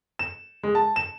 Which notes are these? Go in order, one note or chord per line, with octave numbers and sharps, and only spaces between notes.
E7
G#3
A5
E7